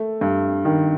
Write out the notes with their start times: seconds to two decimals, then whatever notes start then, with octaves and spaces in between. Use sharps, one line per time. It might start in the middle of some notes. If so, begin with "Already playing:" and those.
Already playing: A3
0.21 G2
0.65 D#3